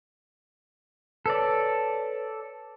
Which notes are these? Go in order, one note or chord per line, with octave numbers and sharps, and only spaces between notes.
A4 B4 C#5 D5